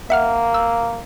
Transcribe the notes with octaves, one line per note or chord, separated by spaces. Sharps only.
A#3 E5 F#5 F6
E6